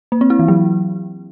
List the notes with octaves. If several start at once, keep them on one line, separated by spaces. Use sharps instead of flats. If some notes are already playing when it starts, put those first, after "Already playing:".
A#3
C4
E4
E3
F#3